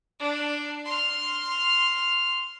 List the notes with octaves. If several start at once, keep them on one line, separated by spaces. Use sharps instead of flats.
D4
C6 F6